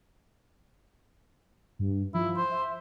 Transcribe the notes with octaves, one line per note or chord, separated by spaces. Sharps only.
G2
F3 E4
C5
E5